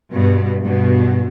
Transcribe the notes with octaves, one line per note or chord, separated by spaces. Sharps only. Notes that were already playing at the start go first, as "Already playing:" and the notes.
G2 B2
G2 B2